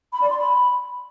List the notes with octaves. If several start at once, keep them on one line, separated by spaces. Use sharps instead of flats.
B5
D5
C6
B5